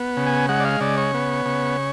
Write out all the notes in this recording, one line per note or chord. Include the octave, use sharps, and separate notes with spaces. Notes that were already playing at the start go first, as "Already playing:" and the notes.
Already playing: B3
C#3
G#5
G#3 F#5
D5
F5
C#3 D5
C#5
B3
C#3